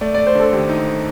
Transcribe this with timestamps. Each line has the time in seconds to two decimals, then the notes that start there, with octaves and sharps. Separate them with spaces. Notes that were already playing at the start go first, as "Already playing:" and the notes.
0.01 A3 D5
0.15 A3 D5
0.27 C5
0.35 D3 A4
0.53 D#2 G4
0.69 D#4